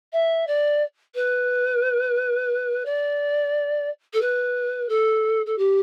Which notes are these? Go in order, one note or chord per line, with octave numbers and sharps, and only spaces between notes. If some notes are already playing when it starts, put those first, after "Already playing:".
E5
D5
B4
D5
A4
B4
A4
A4
G4